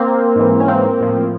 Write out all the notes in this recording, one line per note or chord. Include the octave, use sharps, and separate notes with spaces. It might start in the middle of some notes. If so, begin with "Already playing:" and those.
Already playing: A#3 C4
G#2 E3
C#4
A#3 C4
A2 F3